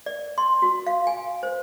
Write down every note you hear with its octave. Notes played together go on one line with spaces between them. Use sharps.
D5
C6
F#4
F5
G#5
C5